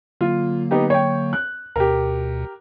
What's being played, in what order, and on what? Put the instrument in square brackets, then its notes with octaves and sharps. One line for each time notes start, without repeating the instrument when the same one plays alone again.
[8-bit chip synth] D3 F#3 A#3 [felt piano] F4
[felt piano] B3 D#4 G4
C#5 G5
F#6
[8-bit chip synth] D2 B2 [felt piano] G4 A#4